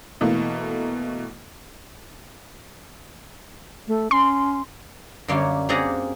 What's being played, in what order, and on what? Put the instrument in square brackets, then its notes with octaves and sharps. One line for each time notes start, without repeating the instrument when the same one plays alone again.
[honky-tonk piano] B2 E3 A3 A#3
[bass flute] A3
[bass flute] C#4 [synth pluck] C6
[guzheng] F#2 D3 G3 A#3 C#5 F5
A#3 C4 D4 G#4 F#5 A#5